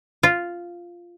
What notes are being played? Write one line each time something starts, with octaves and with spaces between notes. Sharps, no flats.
F4